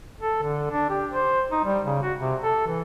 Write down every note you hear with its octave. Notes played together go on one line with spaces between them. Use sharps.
A4
D3
D4
G4
C5
D#4
G3
C#3
F#4
C3
A4
E3